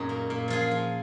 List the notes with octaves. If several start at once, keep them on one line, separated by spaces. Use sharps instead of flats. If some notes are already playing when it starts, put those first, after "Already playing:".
Already playing: F#2 A#2 C#4 D#4 F#4 G#4
A#3
A#2
F3 F4 G#4
F3